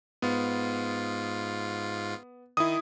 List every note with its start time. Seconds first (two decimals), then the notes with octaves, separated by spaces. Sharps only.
0.22 G#2 B3 F4
2.57 D#3 E4 D#6